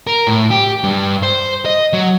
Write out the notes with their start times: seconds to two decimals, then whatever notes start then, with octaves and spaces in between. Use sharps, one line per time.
0.07 A#4
0.27 A2
0.51 G4
0.84 G2
1.23 C5
1.66 D#5
1.93 F#3